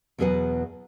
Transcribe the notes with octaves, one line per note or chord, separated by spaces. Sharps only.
E2 B2 F#3 G#4 B4 F#5